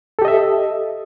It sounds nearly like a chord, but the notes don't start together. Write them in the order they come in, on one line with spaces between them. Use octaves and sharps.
A4 G4 D#5 E5